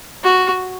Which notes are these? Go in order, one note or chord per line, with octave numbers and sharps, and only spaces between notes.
F#4